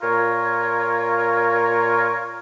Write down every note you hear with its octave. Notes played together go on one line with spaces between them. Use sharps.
A#2 F4 A#4 C#5